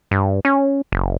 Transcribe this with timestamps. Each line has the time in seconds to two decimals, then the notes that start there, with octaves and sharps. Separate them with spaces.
0.11 G2
0.45 C#4
0.92 F#1